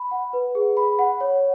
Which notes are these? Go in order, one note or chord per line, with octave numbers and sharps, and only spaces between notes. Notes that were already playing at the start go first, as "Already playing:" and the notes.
Already playing: B5
F#5
B4
G#4
B5
F#5
C#5